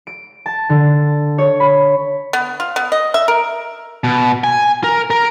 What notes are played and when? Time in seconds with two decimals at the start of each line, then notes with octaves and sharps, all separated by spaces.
0.07 D7
0.46 A5
0.69 D3
1.38 C#5
1.60 B5
2.33 B3
2.60 F4
2.76 B3
2.92 D#5
3.14 E5
3.28 A#4
4.04 B2
4.44 G#5
4.84 A#4
5.10 A#4